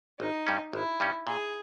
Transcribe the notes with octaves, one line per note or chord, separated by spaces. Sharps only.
G#1 D#4
G2 G3 C#4
G#1 E4
G2 G3 C#4
A#2 G#4